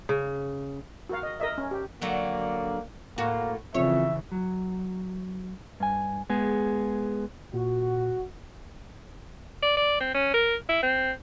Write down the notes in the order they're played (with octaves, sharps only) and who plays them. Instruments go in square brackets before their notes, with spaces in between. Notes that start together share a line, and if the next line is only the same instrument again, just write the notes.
[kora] C#3
[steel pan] F#4 A#4 F5
D#5
A#4 D#5 E5
C#4
G4
[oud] D3 F#3 F#4 [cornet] A#3
[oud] A2 F#4 [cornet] A#3
[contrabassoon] F2 [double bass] C#3 E3 [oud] C#5 [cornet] E5
[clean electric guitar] F#3
G2 G#5
G#3 B3 G#4
[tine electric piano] A#2 [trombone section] F#4
[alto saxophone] D5
D5
C4
C#4
A#4
E4
C4